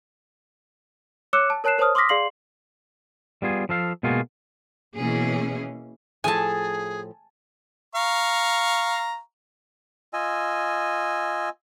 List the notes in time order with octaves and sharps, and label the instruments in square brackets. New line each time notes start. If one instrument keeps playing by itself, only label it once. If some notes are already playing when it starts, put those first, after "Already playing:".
[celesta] C#5 D6 E6 F#6 C#7 E7
A5
A#4 C#5 A5 F#6 C7 E7
A#4 C5 C#5 A5 D#6 F6
C6 D6 D#6 F6 A#6 B6
G#4 D5 F5 C6 C7 F#7
[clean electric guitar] G3 B3 F4 G#4
F3 A4 F5
B2 G#3 A#3 F4 F#4 G#4
[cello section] B2 E3 A#3 C#4 G#4
[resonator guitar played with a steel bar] A2 F3 A4 [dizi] G#4 [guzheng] G#5 A5
[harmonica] F5 A#5 C#6
[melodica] F4 D#5 G#5 E6